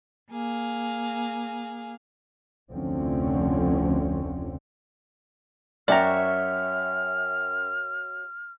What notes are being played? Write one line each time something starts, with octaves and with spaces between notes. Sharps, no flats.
A#3 G#4 F5
F1 D2 D3 F3 C4 C#4
F#2 F#4 C#5 D5 E5 G5 A#5 F6